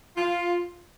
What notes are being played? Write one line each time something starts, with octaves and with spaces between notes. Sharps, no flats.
F4